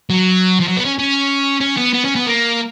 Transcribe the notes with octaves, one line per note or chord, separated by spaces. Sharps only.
F#3
F3
F#3
B3
C#4
C#4
C#4
B3
B3
C#4
B3
A#3